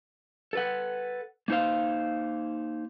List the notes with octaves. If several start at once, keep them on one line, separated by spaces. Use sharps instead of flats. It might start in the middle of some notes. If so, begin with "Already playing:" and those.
A4 B4 F#5
A#3 D#4 C5 F5